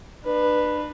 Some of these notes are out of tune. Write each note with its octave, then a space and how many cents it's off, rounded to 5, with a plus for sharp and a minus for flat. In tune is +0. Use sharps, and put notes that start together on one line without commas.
D4 +35 B4 +0